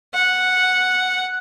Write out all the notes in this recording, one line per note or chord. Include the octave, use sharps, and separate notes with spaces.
F#5